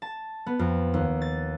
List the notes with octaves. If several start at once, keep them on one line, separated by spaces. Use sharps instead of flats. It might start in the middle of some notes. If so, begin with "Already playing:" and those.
A5
B3
F2
D#2
A6